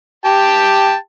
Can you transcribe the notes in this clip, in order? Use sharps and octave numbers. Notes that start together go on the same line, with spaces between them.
G4 G5 A5